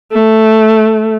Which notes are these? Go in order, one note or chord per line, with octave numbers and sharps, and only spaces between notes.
A3